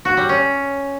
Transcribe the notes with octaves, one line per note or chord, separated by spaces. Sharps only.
F#4
G3
C#4